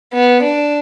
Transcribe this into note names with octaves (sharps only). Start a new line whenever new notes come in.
B3
D4